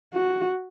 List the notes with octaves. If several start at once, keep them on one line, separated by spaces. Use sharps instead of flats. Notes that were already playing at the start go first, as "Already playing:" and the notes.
F#4